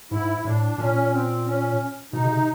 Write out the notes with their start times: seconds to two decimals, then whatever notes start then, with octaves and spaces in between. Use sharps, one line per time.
0.11 G#2 E4
0.45 A2 D4
0.78 A#2 C#4
1.12 C4
1.46 C#4
2.13 B2 D#4
2.25 C#3
2.31 C3